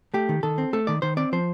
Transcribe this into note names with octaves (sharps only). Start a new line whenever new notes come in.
A3 G4
D#3
D#3 A4
C4
A3 A4
D#3 D5
D#3 C5
C4 D5
F3 C5